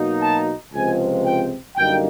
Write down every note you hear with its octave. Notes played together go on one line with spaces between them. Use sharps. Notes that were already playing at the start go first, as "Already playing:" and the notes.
Already playing: B2 F#3 A#3 D#4
A5
C#2 C3 F3 G#3 C4 G#5
G5
F#2 D3 G3 A#3 D#4 G5